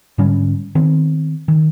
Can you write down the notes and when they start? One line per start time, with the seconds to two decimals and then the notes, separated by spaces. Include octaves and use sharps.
0.18 G#2 D3 G3 C#4
0.75 D#3 B3 C4
1.48 D#3